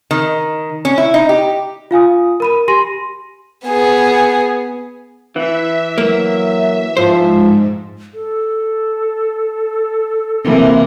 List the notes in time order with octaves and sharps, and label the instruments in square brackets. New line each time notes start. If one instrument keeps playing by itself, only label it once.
[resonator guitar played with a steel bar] D#3
C#4
E4
D#4
G4
[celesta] F4 F5 G#5 D#6
A#4 B5 D#7
G4 G#5 C6 A#6 D#7
[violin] B3 G#4
[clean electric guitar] E3 [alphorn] E4 [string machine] E5
[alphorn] F#3 [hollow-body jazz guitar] A#3
[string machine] G#2 [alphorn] F3 [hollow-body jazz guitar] C5
[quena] A4
[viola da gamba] C3 E3 A#3